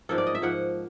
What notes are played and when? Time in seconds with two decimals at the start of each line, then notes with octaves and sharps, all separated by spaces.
0.09 G#2 F3 A#3 A4
0.18 D5
0.26 D#5
0.35 E5
0.42 G#2 F3 A#3 F#5